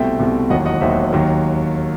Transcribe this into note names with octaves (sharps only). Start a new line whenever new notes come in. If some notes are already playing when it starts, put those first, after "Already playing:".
Already playing: C2 B2 A3 C4 E5 G5
C2 B2 A3 C4
E1 D#2 D#3 F#3 D#5 F#5
D#5 F#5
E1 D#2 D#3 F#3 C5 E5
D#2 D#3 F#3